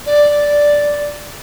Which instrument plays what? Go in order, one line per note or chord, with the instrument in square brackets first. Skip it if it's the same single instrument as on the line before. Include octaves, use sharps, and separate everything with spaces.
[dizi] D5